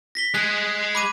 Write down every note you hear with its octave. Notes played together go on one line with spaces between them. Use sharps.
A#6 B6 G7
G#3 G#4 F#6
B5 D6 D#7